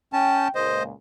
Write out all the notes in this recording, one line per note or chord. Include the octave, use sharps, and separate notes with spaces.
C#4 G5 A5
C#2 A#2 C5 D#5